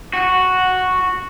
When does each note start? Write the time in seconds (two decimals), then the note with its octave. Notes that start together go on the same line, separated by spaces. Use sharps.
0.14 F#4